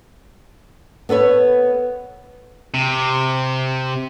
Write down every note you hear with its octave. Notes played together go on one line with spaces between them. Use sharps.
B3 A4 B4 C#5
C3